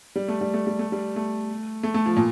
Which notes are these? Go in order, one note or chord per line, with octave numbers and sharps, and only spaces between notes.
G3
A3
G3
A3
G3
A3
G3
A3
A3
A3
F3
A#2